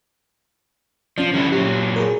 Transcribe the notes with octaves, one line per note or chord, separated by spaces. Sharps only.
F3 C#4 D5
D3 G3 E4
A#2 F#3 G4
G#4 A#4